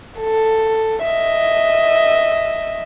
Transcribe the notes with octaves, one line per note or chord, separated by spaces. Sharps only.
A4
D#5 E5